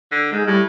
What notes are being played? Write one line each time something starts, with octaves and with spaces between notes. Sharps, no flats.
D3
G#2 G#3
A2 G3